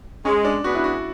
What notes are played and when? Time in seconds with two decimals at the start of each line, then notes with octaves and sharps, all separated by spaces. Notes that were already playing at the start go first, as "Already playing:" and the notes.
0.25 G#3 C#4
0.45 D4
0.64 B3 D4 F#4 G#4 B4
0.75 E4
0.84 F#4